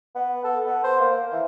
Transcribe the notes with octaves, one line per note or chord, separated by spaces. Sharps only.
B3
A4
B3
C5
A#3
E3